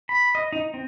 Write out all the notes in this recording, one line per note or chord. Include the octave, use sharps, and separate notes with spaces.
B5
D#5
D#4
C4